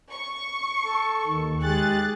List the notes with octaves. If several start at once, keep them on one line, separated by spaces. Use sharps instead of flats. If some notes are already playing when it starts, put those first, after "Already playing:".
C#6
A4
D#2 D#3
G#3 G4 G#4 F#6 A6